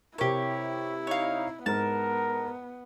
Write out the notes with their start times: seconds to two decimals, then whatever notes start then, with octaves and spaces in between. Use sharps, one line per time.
0.18 C3 E4 G4 A#4 C#5
1.07 D#4 C#5 F5
1.66 G#2 B3 A#4 A5